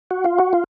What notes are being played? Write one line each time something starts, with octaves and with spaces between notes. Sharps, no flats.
F#4
F4
F#4
F4